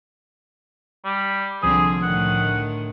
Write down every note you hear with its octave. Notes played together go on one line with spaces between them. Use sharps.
G3
C2 D3 F3 C4 G#4 D#6
A2 D3 D#3 F#5